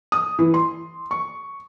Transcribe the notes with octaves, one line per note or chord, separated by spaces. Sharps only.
D#6
E3
C6
C#6